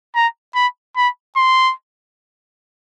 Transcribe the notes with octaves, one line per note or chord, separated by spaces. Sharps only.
A#5
B5
B5
C6